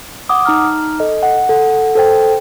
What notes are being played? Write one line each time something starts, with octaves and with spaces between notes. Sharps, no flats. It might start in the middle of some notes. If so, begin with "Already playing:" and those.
F#5 D6 D#6
D#4 A#5 F6
A4 D#5
F#5
A4 F#5
A4 C5 G5